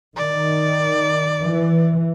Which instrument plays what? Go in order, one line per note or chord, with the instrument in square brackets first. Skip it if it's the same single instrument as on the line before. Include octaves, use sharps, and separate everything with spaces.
[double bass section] D#3 [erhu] D5
[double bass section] E3